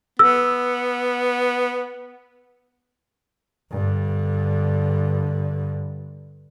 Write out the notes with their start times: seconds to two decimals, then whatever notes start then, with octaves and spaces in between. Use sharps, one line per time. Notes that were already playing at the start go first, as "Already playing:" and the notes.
0.19 B3 E6
3.71 G2 D3